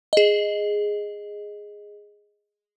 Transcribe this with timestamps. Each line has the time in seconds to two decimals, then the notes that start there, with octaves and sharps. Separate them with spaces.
0.13 G#4 D#5